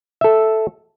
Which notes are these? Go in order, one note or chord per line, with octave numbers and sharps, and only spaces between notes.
A4 E5